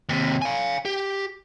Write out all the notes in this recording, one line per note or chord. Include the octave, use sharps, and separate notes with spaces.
D#2 C3
F5 G#5
G4